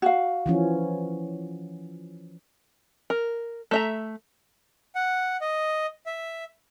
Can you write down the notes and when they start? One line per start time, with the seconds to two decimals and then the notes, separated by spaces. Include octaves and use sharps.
0.02 F#4 F5
0.46 E3 F3 C#4
3.10 A#4
3.71 A3 E5 A#5
4.95 F#5
5.41 D#5
6.06 E5